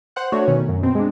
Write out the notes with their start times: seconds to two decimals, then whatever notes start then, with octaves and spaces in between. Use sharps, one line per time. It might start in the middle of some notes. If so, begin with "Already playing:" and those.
0.16 C5 F#5 F#6
0.32 A3 D4 F#4 C#5
0.47 B2 D#3 C#4
0.69 F#2
0.83 B2 C4
0.95 G#3 D4